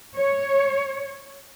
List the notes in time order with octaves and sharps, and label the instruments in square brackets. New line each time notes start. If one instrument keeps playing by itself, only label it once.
[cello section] C#5